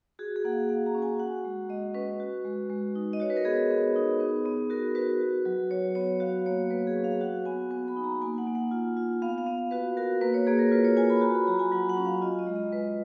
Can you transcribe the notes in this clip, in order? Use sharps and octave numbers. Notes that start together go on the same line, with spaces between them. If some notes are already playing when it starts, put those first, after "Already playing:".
F#4 G#4
G#4
A#3 F#5
F5
A#3 F#5
A#5
C#4
G#5
F#4 F#5
G#3
G#3 D#5
C#4 B4
F#4
G#3
G#3
D#4
D#5
F#4 C#5
B4
A#4
B3 G#4
B3
D#4
B3
B3
F#4 A#4
F#4 B4
F#4
F#3
F#3 C#5
B3 C#5
F#4 F5
A#3 C#5
A#3 B4
G#4
C#4
F5
F#4 F#5
B3 G#5
B3 G#5
B5
D#4
A#5
A#3 G#5
F#5
A#3
F#5
F4
F4
B3 F5
F5
B3
F#4 B4
F#4 A#4
A#3 B4
C#5
A#3 G#4
A#4
F4 B4
C#5
F4 G#5
B5
F#4 A#5
B5
F#3 A#5
G#5
F#3 F#5
F#5
C#4
F5
F4 D#5
D#5
G#3
D#5
G#3 B4